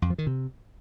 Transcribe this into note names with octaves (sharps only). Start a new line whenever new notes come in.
F2
F3
D#3
C3